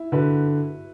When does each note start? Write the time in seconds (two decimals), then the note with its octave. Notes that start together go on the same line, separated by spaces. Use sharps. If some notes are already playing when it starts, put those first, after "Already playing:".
Already playing: E4
0.12 D3 F#4 B4